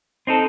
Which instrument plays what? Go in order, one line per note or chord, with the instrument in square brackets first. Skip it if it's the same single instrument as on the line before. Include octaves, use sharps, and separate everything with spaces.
[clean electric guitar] C4 D#4 A4